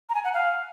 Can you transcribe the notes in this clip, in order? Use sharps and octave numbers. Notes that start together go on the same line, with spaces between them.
A#5
G#5
F#5
F5